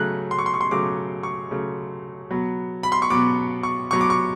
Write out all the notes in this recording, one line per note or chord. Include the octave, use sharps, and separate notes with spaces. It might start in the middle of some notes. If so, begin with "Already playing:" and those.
Already playing: C#3 F#3 A3 F#6
C6
C#6
C6
C#6
C6
C#3 F#3 A3 D6
C#6
C#3 F#3 A3
B2 F#3 B3
B5
C6
C#6
B2 F#3 B3 D6
C#6
B2 F#3 B3 C#6
D6
C#6